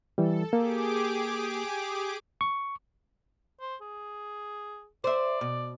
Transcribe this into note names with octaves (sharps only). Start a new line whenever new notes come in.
E3 G3 A4
A#3 G4 G#4 D6
C#6
C5
G#4
C5 D5 E5
B2